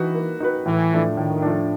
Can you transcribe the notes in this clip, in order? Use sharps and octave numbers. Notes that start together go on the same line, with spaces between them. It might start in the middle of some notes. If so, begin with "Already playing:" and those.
Already playing: E3 D#4 F#4 B4
A#3
D#4 F#4 B4
A2 E3
F3 A3 D4
A2 D#3
F3 A3 D4